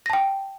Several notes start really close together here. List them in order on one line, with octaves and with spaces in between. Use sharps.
A#6 A5 G5